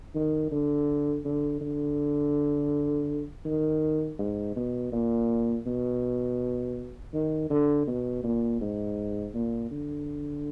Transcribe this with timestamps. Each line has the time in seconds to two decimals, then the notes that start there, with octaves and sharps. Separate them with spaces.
0.15 D#3
0.52 D3
1.25 D3
1.61 D3
3.45 D#3
4.19 G#2
4.56 B2
4.92 A#2
5.66 B2
7.13 D#3
7.50 D3
7.87 B2
8.24 A#2
8.61 G#2
9.34 A#2
9.71 D3